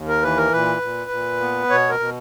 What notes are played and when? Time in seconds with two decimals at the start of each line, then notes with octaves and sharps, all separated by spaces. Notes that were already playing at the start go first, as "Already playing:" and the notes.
Already playing: D#2
0.08 A#4
0.23 E3 B4
0.37 A#4
0.52 A#2 B4
0.82 A#2
1.11 A#2
1.41 B3
1.70 B2 C#5
1.89 A#4
2.00 B2